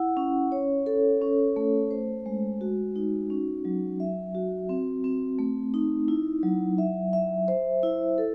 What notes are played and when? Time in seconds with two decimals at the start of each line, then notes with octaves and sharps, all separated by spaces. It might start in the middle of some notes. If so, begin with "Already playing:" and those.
Already playing: E4 F#5
0.17 C#4
0.52 C#5
0.86 A4
1.22 C#4
1.56 A3
1.91 C5
2.26 G#3
2.61 F#4
2.96 D#4
3.30 C#4
3.65 F#3
4.00 E5
4.35 F#4
4.69 C4
5.04 C4
5.39 A3
5.74 D#4
6.08 E4
6.43 F#3
6.78 E5
7.13 E5
7.48 C5
7.83 E4
8.18 A4